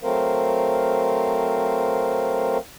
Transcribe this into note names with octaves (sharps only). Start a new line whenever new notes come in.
F#3 A3 C4 A#4 C5 F5